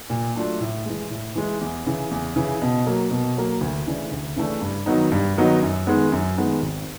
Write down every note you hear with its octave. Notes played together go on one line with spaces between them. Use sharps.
A#2
F#3 A3 D4 F4
A2
E3 G#3
A2
E3 G#3
E2
C#3 E3
E2
C#3 E3
B2
F#3 A#3
B2
F#3 A#3
D2
C#3 E3 A3 D4
D2
C#3 E3 A3 D4
G2
D#3 F#3 B3 D#4
G2
D#3 F#3 B3 D#4
F#2
D#3 G#3 B3 D#4
F#2
D#3 G#3 B3 D#4
G#1